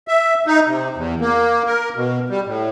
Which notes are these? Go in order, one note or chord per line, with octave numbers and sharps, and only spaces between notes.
E5
D#4
C3
E2
A#3
A#4
B2
G3
A2